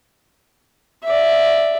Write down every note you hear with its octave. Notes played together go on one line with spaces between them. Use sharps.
D5 E5